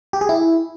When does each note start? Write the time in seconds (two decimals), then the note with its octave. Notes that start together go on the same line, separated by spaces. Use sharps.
0.13 G4
0.21 G#4
0.29 E4